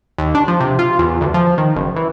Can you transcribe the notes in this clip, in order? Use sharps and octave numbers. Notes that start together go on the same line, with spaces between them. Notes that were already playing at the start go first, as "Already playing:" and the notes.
D#2
D4
F3
C3
F4
E2
D2
F3
D#3
F#1
E3